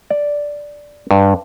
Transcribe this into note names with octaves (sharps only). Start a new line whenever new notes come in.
D5
G2